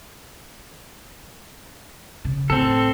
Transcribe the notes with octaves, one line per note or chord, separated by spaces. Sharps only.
C#3
A2 C4 A4